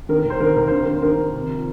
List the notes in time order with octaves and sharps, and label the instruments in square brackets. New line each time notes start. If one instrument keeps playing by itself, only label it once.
[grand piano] D#3 A#4
A#4
D#2 C5
D#3 A#4
D#2 A#4
D#3 C5
A#4
D#3
C5
D#3 A#4
D#3
C3
F3